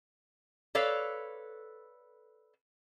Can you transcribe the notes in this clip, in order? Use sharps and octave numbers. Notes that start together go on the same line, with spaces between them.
A4 B4 C#5 D5 F5